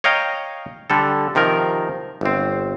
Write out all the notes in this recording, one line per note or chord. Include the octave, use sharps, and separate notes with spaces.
C#5 D#5 F5 G5 A#5
D3 G3 A4
C3 D#3 F3 A#4
G1 C4